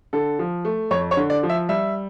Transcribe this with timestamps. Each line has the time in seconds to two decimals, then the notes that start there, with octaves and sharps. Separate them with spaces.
0.13 D3 A4
0.39 F3
0.65 A3
0.91 F2 C#5
1.11 C#5
1.17 D3
1.30 D5
1.43 F3
1.50 E5
1.69 G3 E5